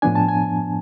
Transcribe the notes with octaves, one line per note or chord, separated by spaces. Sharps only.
A2 F3 B3 D4 G#5
A5
G#5